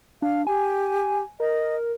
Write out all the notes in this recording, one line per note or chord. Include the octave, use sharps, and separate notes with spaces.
D4 F5
G4 G#5
A#4 D#5